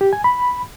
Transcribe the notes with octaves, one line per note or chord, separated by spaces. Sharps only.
G4
G#5
B5